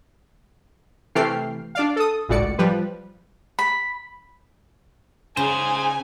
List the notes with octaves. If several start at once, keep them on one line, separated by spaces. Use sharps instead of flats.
C3 E3 A3 G5 F6 C7
D4 D5 F5
A4 D#6
G#1 C#2 A2 F#4 D5 C#7
F3 G3 B4
B5
C#3 G#4 C5 G#5